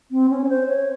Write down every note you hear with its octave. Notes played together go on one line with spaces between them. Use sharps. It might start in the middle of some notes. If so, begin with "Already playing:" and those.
C4
C#4
C#5
C5
C#5